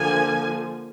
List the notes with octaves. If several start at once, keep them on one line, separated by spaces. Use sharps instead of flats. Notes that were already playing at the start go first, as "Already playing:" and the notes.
Already playing: D3 F3 A#3 G#5